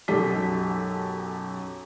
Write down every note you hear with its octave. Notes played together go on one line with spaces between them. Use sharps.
B1 F#2 G4 A4 B6